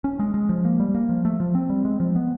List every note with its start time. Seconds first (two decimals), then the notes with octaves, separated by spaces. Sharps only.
0.04 C#4
0.19 G#3
0.34 G#3
0.49 F3
0.65 A#3
0.80 G3
0.95 A#3
1.09 F3
1.25 A3
1.40 F3
1.55 C4
1.70 G3
1.85 G#3
2.00 F3
2.16 B3